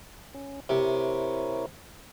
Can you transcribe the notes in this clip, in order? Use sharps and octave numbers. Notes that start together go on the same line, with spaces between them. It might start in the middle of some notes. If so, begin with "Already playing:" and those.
C#4
C3 E4 A#4 C#5